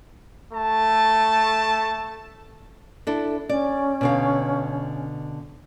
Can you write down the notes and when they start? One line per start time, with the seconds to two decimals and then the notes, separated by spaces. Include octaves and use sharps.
0.53 A3 A5
3.07 D4 E4 A4
3.49 C#4 D5
4.01 B2 D3 F5